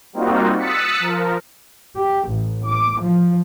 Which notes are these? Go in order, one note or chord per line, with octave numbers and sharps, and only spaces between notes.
G3 A#3 C4 D#4 F4 F#4
D#6 E6 F#6 A6 B6 C#7
F3 A#4
G4
A1
D6
F3